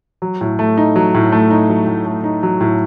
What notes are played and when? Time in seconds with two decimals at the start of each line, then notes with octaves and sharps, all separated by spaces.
0.22 F#3
0.41 A2
0.59 A3
0.77 D#4
0.96 F#3
1.14 A2
1.32 A3
1.50 D#4
1.69 F#3
1.87 A2
2.06 A3
2.24 D#4
2.43 F#3
2.61 A2